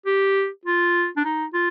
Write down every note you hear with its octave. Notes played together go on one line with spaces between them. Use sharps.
G4
F4
D4
D#4
F4